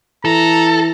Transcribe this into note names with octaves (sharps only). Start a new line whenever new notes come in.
E3 A4 A#5